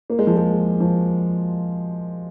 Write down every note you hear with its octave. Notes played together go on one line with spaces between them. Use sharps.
A#3
G#3
F3
G#3
F3